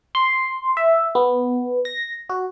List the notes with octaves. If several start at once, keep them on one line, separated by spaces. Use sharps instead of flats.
C6
E5
B3
A#6
F#4